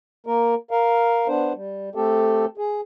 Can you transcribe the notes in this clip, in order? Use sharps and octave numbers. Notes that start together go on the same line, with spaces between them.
A#3 A#4
A#4 F5
B3 D4 C5
G3
A3 C4 G4 A4
G#4